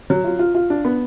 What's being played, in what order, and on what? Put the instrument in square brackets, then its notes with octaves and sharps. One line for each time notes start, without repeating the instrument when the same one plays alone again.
[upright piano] F#3
F4
F4
F4
D4
B3